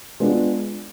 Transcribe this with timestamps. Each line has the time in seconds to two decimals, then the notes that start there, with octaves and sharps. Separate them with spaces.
0.20 G#3 B3 D4 F4